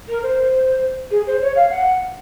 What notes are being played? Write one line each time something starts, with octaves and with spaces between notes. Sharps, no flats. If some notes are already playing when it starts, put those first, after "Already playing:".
A#4
C5
G#4
C5
C#5
F5
F#5